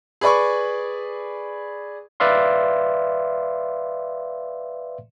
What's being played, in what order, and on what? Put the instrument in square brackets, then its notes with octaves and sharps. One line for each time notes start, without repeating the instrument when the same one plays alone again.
[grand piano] G#4 B4 D5 B5 C#6
[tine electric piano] B4 D5 E5 F5 C6